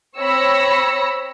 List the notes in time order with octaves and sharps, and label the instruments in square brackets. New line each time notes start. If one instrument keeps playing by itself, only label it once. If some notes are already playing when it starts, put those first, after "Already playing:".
[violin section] C4 C#5 B5 E6 A#6 C#7